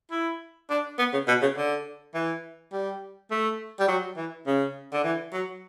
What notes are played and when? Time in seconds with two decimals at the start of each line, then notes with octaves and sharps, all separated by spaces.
0.11 E4
0.70 D4
0.99 B3
1.13 C#3
1.28 B2
1.42 C#3
1.57 D3
2.14 E3
2.72 G3
3.31 A3
3.80 G3
3.88 F#3
4.17 E3
4.47 C#3
4.93 D3
5.04 E3
5.33 F#3